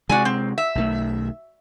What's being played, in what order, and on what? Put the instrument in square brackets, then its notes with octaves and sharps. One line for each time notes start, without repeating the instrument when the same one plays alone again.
[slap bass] C3 G#3 [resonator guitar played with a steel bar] F#4 D5 G#5
[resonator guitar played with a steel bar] C4
E5
[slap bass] B1 D#3 A3